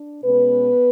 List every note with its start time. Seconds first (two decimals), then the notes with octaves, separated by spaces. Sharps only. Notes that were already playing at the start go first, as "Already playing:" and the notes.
Already playing: D4
0.24 B2 G#3 B3 C#4 B4